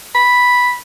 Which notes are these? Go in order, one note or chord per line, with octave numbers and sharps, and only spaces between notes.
B5